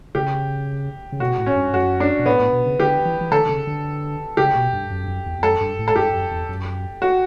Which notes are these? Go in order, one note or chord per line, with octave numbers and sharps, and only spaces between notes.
C#3 G4
C#3
B2 F#4
A2
C#4
G2
F#2 F#4
D4
B2
A2 B3
A2
B2
C#3
D3 G4
E3
E3
D3 A4
D3
C#3
D3
C#3 G4
B2
G2
F#2
G2
F#2
E2
E2
F#2 A4
G2
A2
A4
G2 G4
F#2
E2
F#2
F#4